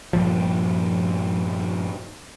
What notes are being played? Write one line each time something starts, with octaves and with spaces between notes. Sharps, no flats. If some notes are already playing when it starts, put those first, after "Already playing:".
G2 A#2 F3